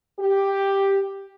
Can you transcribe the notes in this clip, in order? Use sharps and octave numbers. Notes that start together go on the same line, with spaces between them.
G4